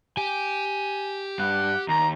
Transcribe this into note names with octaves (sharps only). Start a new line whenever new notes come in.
G4 G#5
G2 F#5
D#2 A#5